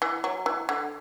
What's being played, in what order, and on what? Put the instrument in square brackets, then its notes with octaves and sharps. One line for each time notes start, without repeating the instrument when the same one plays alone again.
[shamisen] E3
F#3
E3
D3